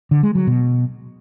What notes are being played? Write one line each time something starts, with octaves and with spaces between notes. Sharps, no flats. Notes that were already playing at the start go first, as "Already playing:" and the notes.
D3
G#3
F#3
B2